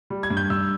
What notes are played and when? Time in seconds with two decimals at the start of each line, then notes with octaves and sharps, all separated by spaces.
0.10 G3
0.23 G#6
0.30 G2
0.37 G6
0.50 G2 E6